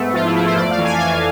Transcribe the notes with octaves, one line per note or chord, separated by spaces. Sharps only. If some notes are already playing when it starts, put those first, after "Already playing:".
Already playing: G#2 A3 B3 E5
F3 F4
E4
A3 F4
C5
F2 D5
F5
E3
G#5
E3 F5